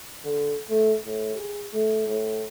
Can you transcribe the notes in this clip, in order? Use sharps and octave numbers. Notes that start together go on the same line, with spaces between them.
D3
A3
A2
G#4
A3
A2